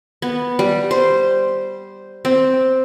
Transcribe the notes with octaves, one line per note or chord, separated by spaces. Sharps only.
B3
G3
C5
C4